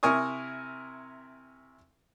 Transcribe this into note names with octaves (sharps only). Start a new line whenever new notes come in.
C3 E4 A#4 G#5 C#6 D#6